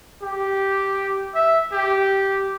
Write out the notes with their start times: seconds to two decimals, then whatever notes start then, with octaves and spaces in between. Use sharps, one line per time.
0.22 G4
1.34 E5
1.72 G4